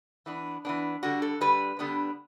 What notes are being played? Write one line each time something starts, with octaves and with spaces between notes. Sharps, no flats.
E3 B3 D4
E3 B3 D4
D3 G3 D4 F#4
A4
D3 G3 D4 B4
D3 G3 B3 D4